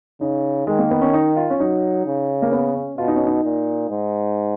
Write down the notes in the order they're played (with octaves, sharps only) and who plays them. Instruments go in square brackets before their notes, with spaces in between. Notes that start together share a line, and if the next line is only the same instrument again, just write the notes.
[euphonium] C#3 [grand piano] D#4
[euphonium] D#3 [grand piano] G#3
[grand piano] A#3
B3
C#4
D#4
F4
C#4
[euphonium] F#3 [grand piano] D#4
[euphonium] C#3
[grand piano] A#3
B3
C#4
[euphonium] B2 [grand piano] F4
[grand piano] D#4
C#4
D#4
[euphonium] A#2
G#2